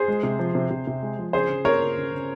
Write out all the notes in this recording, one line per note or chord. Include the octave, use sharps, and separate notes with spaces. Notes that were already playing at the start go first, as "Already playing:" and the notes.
Already playing: G#4 C5
G#3
C3
F3
C3
C3
C3
G#3
F3
C#3 G#4 C5
C#3
A#3 A#4 C#5
C#3
C#3
C#3